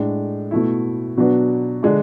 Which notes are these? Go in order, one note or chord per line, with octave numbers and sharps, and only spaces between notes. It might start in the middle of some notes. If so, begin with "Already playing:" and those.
Already playing: A2 G#3 D4
B2 A3 E4
B2 F#3 B3 D4
D3 G#3 D4